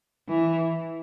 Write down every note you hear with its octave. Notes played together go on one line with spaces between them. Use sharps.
E3